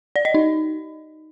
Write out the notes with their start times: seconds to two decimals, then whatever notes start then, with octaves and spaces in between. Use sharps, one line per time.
0.16 D5
0.25 D#5
0.34 D#4